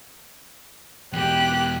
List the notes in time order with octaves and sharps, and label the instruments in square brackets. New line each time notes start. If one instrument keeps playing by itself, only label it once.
[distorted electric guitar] E2 B2 [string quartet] G4 F#6